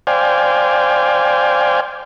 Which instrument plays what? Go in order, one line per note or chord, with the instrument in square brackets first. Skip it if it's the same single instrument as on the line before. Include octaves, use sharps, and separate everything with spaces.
[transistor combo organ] C5 D5 F5 G5 G#5